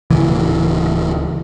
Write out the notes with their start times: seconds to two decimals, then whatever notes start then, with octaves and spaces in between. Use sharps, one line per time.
0.10 D1 C#3 E3